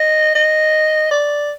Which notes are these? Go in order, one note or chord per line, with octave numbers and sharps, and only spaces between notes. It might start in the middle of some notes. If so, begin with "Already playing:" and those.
Already playing: D#5
D#5
D5